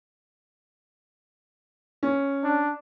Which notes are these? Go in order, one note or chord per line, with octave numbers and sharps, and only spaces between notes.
C#4
D4